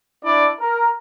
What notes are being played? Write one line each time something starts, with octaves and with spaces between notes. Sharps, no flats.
D4 E4 D5
A#4